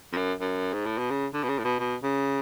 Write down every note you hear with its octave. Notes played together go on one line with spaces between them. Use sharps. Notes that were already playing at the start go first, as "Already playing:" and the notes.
F2
F#2
F#2
G#2
A2
B2
C#3
D3
B2
C#3
A2
B2
B2
C#3